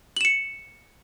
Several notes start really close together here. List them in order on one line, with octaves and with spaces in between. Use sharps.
F#7 E7 C#7